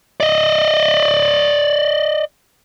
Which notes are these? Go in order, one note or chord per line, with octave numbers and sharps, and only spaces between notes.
D5 D#5